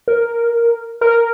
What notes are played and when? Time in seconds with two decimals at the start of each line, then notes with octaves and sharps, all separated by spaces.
0.08 A#4
1.01 A#4